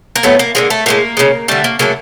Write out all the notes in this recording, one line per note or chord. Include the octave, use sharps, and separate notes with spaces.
A#3
A2 F#3 A3 B3
A#3
D3 F3 G#3 A#3
A3
A2 F3 G#3 A#3
C#3 F3 G#3
D3 G3 A3
A#3
C#3 F#3 A3 A#3